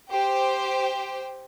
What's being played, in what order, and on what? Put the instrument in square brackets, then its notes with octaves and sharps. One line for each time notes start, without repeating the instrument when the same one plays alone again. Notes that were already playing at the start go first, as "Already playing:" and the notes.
[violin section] G4 C5 G5